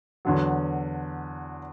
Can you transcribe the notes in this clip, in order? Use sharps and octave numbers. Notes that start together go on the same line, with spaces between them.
E2 D3 F#3